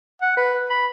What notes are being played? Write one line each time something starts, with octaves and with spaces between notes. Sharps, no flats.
F#5
B4
B5